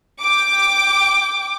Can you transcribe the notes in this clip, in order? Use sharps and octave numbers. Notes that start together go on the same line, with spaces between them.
G5 D6